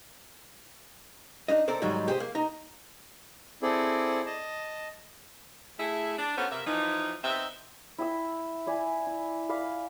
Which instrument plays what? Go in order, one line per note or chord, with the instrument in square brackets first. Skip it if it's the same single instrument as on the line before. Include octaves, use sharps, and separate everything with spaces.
[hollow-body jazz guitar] D4 D#4 D#5
C4 A4 A#4 C5 D5
G#2 D#3 F#3 G3
G4 G#4 C5
A#3
D#4 A#5
[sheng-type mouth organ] C4 E4 G#4 A4 D5
D#5 A5
[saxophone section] A3 E4 G#4
D4
A#3 B3 C#4 F#4 A4 C5
C3 A#3 E5
E3 F3 D#4
B3 C4 D#4 E5
[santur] E4 G5 E6
E4 D5 G#5
E4
D5 F5 B5